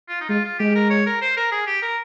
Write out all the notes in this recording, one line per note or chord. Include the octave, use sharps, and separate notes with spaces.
F4
D#4
G#3 F4
F4
G#3 G4
A#4
C#5
A#4
C5
A#4
G#4
G4
A#4